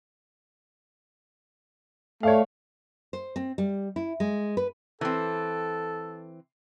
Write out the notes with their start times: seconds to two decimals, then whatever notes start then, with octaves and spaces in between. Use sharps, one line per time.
2.23 A3 C#5 D5 F5
3.13 C5
3.36 C4
3.58 G3
3.96 E4
4.20 G#3
4.57 B4
5.01 E3 C4 A4